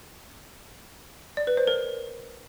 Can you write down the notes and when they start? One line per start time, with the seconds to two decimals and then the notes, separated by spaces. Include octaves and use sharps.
1.37 D5
1.47 B4
1.57 C5
1.67 A#4